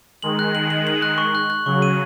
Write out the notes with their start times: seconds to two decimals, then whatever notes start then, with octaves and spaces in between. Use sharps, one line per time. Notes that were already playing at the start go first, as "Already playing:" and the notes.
0.23 D#3 G#3 F#7
0.39 F#6
0.55 F#7
0.70 F#7
0.87 F#7
1.02 F#6
1.18 C#6
1.35 F#6
1.50 F#6
1.66 C#3 F#3 C#6
1.82 D#7